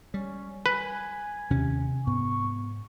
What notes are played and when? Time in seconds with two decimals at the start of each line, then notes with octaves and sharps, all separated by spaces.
0.14 G3 C#4
0.66 B4 G#5
1.50 D#2 C3 C#4
2.07 G#2 B3 C#6